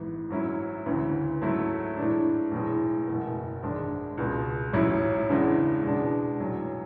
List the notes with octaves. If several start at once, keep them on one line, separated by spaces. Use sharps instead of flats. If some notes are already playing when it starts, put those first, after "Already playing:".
Already playing: A1 G#2 E3 B3
G#2 F#3 C#4 E4
D2 C#3 E3
G#2 F#3 A3 E4
A2 E3 G#3 D4
B1 A2 E3 G#3
F#1 E2 B2
G#1 G#2 G#3 D4
C#2 B2 G#3 B3
A1 G#2 F#3 C#4 E4
E2 C#3 E3 G#3 D4
E2 B2 G#3 D4
B1 A2 F#3